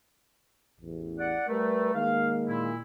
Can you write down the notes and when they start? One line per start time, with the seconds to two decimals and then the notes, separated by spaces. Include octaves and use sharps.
0.79 A1 E2
1.18 D5 F#5
1.48 G3 A3 A#4 B4
1.95 D#3 G#3 A#3 F5
2.47 A#2 E4